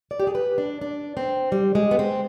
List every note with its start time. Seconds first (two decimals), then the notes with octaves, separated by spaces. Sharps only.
0.11 D5
0.20 G4
0.27 G#4
0.35 B4
0.58 D4
0.81 D4
1.17 C4
1.52 G3
1.75 G#3
1.91 B3
1.99 C4